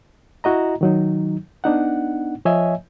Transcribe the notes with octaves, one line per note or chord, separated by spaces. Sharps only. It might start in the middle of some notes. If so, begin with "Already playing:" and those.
E4 F#4 D#5 A#5
D#3 F#3 D#4
B3 D4 D#4 F#5
F3 C#5 D#5 E5 G#5